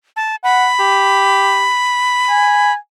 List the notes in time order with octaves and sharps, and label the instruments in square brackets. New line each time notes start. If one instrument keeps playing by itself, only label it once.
[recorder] A5
[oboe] F#5 [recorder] B5
[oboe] G4
G#5